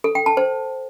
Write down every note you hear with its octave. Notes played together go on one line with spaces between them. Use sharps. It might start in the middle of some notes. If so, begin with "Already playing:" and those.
A4
G5
A5
C5